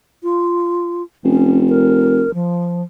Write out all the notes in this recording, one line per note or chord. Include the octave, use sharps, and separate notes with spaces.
F4
F1 C#4
A#4
F3